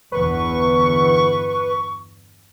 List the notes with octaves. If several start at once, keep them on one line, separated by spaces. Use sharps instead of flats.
G1 E2 B3 B4 C#6